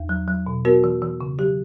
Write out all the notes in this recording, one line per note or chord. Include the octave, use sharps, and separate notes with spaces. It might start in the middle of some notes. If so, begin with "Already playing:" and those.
Already playing: E2
F#3
F#3
B2
B3 F#4 A#4
E3
E3
C#3
F#3 G4